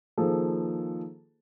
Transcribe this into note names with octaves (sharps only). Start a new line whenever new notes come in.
D#3 F3 A#3 G#4 A4 C5